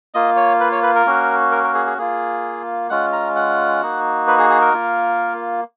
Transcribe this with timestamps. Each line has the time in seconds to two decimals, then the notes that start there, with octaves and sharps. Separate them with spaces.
0.14 A#3 F4 D#5
0.37 C#5
0.60 B4
0.72 C#5
0.83 B4
0.95 A#4
1.06 A#3 C#4 F#4
1.51 A#4
1.64 A#4
1.74 G#4
1.86 G#4
1.98 A#3 F4 G#4
2.90 G#3 C#4 F4 F#5
3.13 A#5
3.36 F#5
3.81 A#3 D#4 F#4
4.28 B4
4.39 G#4
4.50 G#4
4.61 A#4
4.74 A#3 F4